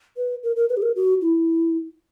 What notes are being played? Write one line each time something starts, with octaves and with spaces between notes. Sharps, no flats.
B4
A#4
A#4
B4
G4
A#4
F#4
E4